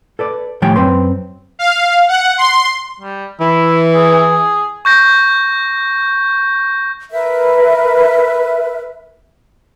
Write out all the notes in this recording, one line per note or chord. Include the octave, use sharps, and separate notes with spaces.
A4 B4 D5
A2 D#3 F3 G3 G5 G#5
F#2 C4 B4 G5 C6
F5
F#5
C6
G3
E3 E4
G#4
C#6 G6 A#6
A#4 B4 E5